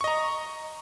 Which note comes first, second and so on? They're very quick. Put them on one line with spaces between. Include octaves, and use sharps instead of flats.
C#6 D#5 A#5